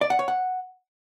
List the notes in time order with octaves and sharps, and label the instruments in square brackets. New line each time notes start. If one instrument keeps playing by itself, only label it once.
[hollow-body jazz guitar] D5
F#5
C#5
F#5